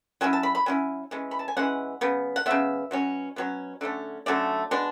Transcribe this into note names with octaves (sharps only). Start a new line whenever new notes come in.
F#3 C#4 E4 G#5
A5
B5
B5
F#3 C#4 E4 G#5
E3 G#3 C#4
B5
A5
G#5
E3 G#3 C#4 F#5
C#3 F#3 B3
F#5
C#3 F#3 B3 E5
B2 F#3 C#4
B2 F#3 C#4
D3 F#3 A3 C#4
D3 F#3 A3 C#4 D5
B2 G#3 D4